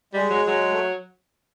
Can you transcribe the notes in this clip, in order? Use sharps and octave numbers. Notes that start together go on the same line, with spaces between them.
G3 G#3
F#3
F#3
A3